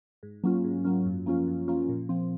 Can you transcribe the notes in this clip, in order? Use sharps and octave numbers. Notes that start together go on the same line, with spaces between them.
G#2
F#3 A#3 C#4 F4
G#2
F#3 A#3 C#4 F4
F#2
F3 A#3 C#4 F4
F#2
F3 A#3 C#4 F4
A#2
F3 C4